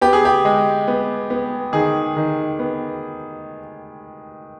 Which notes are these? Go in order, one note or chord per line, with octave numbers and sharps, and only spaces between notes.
B3 G4
G#4
G4
G#3
B3
B3
D#3 G#4
D#3
B3